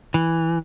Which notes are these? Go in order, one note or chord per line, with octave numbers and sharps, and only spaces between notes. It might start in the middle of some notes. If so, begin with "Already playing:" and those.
E3